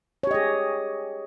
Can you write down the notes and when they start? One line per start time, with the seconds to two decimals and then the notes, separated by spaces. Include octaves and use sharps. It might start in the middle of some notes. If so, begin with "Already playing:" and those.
0.23 C#5
0.27 G4
0.31 D#5
0.34 G#4